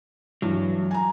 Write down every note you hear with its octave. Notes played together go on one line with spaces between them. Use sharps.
G2 E3 F#3
G#5 A#5